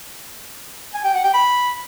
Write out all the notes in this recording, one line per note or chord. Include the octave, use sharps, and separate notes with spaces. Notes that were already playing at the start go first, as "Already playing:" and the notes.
G#5
G5
F#5
G5
B5